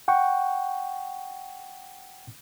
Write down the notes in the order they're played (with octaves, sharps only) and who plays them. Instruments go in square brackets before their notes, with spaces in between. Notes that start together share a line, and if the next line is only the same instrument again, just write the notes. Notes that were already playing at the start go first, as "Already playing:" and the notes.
[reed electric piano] F#5 G5 C#6